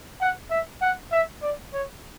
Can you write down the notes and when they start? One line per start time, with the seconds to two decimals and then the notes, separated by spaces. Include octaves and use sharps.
0.21 F#5
0.51 E5
0.82 F#5
1.12 E5
1.42 D5
1.73 C#5